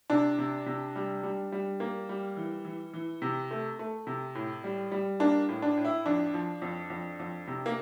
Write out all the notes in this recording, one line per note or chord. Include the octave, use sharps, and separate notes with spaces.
C3 D4
C3
C3
G3
G3
G3
A#3
G3
E3
E3
E3
C3
A3
A3
C3
A2
G3
G3
A#3 D4
A2
D4
A2
E4
F2 D4
F3
F2
F2
F2
C3
A#3